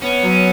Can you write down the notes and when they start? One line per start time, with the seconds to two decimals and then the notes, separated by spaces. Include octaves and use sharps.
0.02 B3 C#4
0.23 F#3